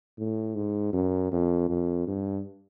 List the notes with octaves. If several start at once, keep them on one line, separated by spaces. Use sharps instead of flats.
A2
G#2
F#2
F2
F2
G2